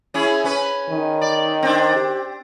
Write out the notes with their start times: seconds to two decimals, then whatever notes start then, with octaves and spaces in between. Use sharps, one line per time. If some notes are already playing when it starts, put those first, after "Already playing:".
0.14 C#4 E4 G#4
0.44 C#4 B4
0.90 D#3
1.22 D5
1.63 C4 D4
1.96 G4